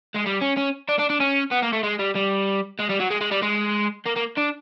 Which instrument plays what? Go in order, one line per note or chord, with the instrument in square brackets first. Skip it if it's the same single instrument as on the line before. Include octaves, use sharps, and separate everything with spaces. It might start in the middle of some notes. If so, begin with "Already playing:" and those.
[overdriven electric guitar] G#3
G3
C#4
C#4
D4
D4
D4
C#4
B3
A#3
A3
G#3
G3
G3
G#3
G3
F#3
G#3
G#3
G3
G#3
A#3
A#3
D4